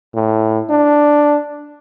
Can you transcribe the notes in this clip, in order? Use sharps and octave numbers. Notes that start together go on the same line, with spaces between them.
A2
D4